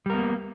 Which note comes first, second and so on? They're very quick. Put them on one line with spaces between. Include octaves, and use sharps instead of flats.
G3 A#4 B3 A#3